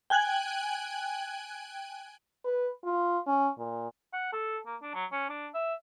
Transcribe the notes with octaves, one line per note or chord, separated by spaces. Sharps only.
G5 G#5 F#6 G#6 F#7
B4
F4
C#4
A#2
F#5
A4
A#3
D4
F#3
C#4
D4
E5